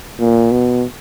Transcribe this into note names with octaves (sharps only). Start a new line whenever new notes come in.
A#2
B2